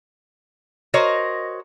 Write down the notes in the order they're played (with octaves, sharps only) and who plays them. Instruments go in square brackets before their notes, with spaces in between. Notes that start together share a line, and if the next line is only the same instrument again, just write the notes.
[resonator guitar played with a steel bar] F#4 A#4 C5 C#5 D#5